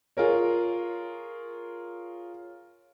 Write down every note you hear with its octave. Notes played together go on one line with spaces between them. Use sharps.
F4 G#4 A#4 C#5